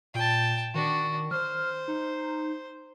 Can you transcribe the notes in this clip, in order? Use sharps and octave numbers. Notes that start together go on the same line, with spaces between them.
A#2 G5 A5
D#3 D4 F#4
C5 F6
D#4